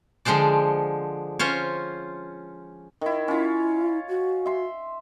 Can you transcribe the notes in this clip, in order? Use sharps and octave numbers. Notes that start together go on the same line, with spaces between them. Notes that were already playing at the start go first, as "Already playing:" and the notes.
D3 F3 G#3 C5 D5
C#4 F4 C5 C#5
D#3 E4
C#4 E4 F4
F#4
E5 C6